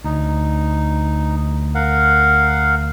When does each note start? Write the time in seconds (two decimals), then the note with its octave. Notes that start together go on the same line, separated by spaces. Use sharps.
0.04 D2 D#4
1.75 A#4 F5 F#5